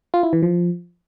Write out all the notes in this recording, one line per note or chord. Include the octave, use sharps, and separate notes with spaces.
F4
E4
E3
F3